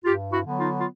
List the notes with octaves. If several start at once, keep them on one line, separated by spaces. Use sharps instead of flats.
G2 F4 G4
E4 F#4
D3 F#3 B3
D#4 F4
F4